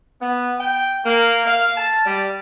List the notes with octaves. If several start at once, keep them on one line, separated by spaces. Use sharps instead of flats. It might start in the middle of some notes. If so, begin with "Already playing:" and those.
B3
G5
A#3
F5
A5
G3